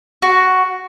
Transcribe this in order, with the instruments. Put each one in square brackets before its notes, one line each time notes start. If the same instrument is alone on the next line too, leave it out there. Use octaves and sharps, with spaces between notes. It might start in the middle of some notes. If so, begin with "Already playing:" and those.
[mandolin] F#4